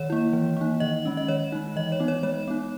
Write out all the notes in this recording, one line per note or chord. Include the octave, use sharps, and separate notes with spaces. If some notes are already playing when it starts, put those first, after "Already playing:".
Already playing: D#3 C#5
A#3 E4
E3
A#3 D#4
D#3 D#5
G#3 C#4
D#5
D#3 C#5
G#3 D#4
E3 D#5
C#5
B3 D#4
C#5
G#3 C#5
B3 D#4